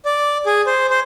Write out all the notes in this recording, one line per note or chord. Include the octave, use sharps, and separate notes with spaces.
D5
G#4
C5
C5